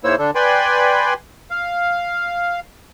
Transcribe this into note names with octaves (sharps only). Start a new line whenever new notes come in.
G#2 A#3 E4 C5 C#5 E6
D3 D4 A4
B4 D5 G5 G#5 B5 C6
F5